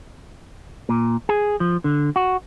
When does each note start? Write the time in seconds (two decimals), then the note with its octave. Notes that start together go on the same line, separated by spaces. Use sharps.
0.89 A#2
1.29 G#4
1.60 F3
1.84 D3
2.16 F#4